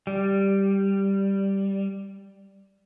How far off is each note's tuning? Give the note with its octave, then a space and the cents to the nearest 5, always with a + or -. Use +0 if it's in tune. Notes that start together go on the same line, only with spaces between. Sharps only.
G3 +0